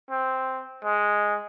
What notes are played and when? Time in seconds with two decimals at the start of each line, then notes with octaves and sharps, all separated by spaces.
0.10 C4
0.84 G#3